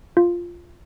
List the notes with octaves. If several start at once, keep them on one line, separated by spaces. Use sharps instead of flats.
F4